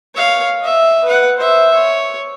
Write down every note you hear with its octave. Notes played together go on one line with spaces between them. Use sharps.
C#5 F5
D#5 E5
B4 F#5
C5 E5
C#5